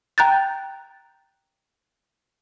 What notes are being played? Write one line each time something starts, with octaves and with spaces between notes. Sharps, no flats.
G5 A#5 F#6 G6 A6